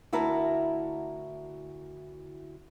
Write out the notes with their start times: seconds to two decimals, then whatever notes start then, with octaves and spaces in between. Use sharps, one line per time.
0.13 D2 E4 F#4 A#4 A5